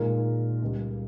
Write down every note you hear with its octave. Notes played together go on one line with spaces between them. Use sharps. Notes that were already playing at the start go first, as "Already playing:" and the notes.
Already playing: A#2 G#3 D#4 A#4
C#2 C#3 G3